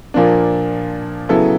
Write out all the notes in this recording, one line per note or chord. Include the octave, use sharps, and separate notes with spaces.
A#2 F3 A#3 D4
C#3 F#3 B3 E4 A4